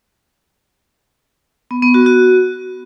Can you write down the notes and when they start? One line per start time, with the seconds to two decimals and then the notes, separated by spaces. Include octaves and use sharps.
1.71 B3
1.83 B3
1.94 F#4
2.06 F#4